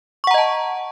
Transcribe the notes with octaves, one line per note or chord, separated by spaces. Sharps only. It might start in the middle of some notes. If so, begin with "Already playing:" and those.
D#5 F#5 A5 A#5 C#6